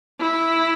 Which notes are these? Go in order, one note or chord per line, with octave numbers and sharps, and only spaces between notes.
E4